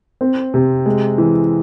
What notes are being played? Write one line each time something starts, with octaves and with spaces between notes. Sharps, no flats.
C4
C3
G#3
E3